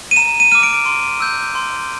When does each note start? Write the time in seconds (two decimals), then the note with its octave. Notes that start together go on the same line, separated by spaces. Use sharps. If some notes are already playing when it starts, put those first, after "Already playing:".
0.11 D#7
0.16 A#5 E7
0.40 D#7
0.52 D6 F6 D#7
0.63 D7
0.86 C6
1.20 E6 G6
1.55 C6